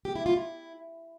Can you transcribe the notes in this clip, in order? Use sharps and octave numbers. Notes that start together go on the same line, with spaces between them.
G4
E4
F4
E4